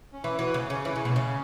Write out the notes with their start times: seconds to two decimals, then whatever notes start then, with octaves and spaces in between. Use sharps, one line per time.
0.13 C#4
0.24 E3 E4
0.39 E3 F#4
0.54 C#3 C#4
0.70 C#3 C#4
0.84 E3 E4
0.95 C#3 C#4
1.05 B2 E4
1.15 C#3 C#4